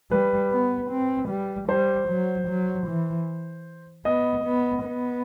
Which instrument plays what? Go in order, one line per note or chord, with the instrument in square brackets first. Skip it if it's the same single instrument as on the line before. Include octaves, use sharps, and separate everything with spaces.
[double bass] G3 [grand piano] B4
[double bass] B3
C4
G3
[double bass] G3 [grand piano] C5
[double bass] F#3
F#3
E3
[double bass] B3 [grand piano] D#5
[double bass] B3
B3